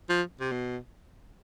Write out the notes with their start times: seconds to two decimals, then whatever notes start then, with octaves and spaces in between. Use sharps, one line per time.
0.09 F3
0.40 C3
0.52 B2